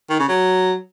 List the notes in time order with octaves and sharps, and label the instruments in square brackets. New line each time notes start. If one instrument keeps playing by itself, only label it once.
[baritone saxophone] D#3
C#3
F#3